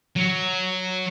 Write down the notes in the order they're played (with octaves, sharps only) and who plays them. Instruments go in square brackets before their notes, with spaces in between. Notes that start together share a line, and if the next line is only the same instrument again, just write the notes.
[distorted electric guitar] F#3